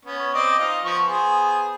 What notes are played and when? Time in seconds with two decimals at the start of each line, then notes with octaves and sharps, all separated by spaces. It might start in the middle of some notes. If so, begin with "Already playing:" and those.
0.05 B3 C#4 C#5
0.34 C4 D5 D#5
0.58 D#4 F4 D#5
0.84 F3 B3 C#6
1.06 B3 G#4 C5